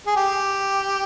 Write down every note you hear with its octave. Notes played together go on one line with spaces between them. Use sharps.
G#4
G4